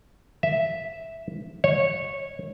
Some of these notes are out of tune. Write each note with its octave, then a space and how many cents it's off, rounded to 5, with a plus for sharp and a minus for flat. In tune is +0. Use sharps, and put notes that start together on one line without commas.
E5 -5
C#5 -15